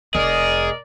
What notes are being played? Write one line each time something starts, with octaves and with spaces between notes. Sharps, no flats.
F1 G#4 A#4 D5 D#5